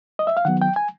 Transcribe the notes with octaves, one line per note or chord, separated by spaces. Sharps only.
D#5
E5
F5
D#3 F#3 B3 F#5
G5
G#5